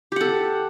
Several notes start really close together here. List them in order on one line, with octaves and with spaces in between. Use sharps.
G4 F#5 A4